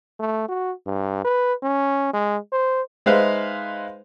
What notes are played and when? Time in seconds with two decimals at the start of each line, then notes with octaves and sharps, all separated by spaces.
0.20 A3
0.49 F#4
0.86 G2
1.25 B4
1.62 C#4
2.14 G#3
2.52 C5
3.06 G#3 D#4 B4 C5 E5 F5